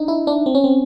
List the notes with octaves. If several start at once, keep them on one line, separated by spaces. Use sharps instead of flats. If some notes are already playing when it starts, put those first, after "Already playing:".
Already playing: D4 D#4
E4
D4
C4
C#4
C4